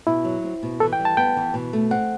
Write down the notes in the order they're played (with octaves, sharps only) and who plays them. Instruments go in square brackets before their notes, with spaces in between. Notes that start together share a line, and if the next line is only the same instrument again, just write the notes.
[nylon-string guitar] B2 [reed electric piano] E4
[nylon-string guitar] F#3
C4
B2
[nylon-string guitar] E3 [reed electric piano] A4
[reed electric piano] G5
[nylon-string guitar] G3
[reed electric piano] A5
[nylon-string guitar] B3 [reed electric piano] G5
[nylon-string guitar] E3
B2
A3
[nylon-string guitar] C4 [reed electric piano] F#5